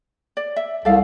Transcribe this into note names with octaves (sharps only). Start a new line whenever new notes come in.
D5
E5
C2 A4 D5 F5